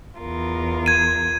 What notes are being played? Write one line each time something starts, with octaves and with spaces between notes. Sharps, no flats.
E2 F4 A#4
G#6 D#7